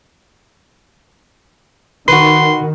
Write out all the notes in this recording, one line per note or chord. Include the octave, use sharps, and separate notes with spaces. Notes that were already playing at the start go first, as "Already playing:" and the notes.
D#3 F#4 B4 C6